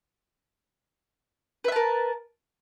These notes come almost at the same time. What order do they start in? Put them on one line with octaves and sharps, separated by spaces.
B4 E5 A5 A#4